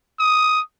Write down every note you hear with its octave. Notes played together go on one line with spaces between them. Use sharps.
D#6